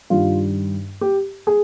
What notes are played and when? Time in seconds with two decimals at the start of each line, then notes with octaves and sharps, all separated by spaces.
0.10 G2 D#3 G3 F4
1.01 G4
1.47 G#4